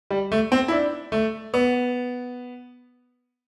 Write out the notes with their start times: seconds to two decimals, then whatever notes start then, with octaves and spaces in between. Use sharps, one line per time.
0.11 G3
0.32 A3
0.52 C4
0.68 E4
0.72 D4
1.12 A3
1.54 B3